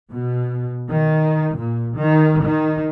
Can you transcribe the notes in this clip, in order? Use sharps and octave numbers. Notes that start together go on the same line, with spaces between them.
B2
D#3
A#2
D#3
D#3